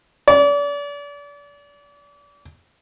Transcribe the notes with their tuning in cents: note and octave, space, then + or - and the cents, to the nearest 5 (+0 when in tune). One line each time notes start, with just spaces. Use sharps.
D5 -35